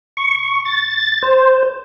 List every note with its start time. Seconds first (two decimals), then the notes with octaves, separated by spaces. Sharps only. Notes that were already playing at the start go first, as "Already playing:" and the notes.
0.17 C#6
0.65 A6
1.22 C5